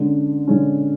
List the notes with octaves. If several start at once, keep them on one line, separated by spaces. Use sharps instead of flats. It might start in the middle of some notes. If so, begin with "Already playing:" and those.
Already playing: D3 G#3 C#4
D3 G#3 C#4